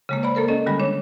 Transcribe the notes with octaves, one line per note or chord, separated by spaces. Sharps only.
C#3 G#3 A#3
C5 D5 B5
A#3 A4 A#4 C5
C#4 A4 D#5
D3 D#3 G3 G#3 B5
D4 C#5